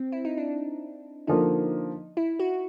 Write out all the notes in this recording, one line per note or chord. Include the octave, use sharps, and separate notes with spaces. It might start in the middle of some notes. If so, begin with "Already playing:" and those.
Already playing: C4
E4
D#4
D4
D3 F3 A#3 D#4
E4
F#4